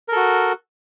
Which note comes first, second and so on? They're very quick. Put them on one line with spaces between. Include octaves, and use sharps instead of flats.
A#4 A4 F#4